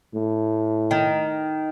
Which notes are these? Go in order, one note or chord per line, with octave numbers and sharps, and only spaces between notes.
A2
D#3